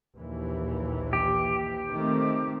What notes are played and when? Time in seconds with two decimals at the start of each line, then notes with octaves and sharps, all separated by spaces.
0.16 A#1 D#2 E3
1.13 G4
1.94 D#3 A3 C4